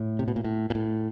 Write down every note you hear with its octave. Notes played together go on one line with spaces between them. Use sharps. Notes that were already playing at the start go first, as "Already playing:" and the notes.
Already playing: A2
C3
B2
A#2
A2
A#2
A2